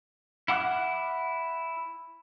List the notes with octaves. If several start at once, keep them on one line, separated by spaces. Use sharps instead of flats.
E4 F#5 D6 F6 F#6